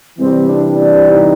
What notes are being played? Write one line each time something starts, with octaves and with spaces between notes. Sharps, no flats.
C3 E3 G3 C4
D4
D4
D#4